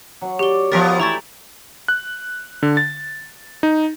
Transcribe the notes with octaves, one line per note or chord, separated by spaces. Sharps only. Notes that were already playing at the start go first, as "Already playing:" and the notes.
F#3 F#5
G4 D5 C#6 G7
F3 B3 E4 G4 A#4 E5 A6 B6
E3 A3 E4 A#5 C#6 A6
F#6
D3
A6
D#4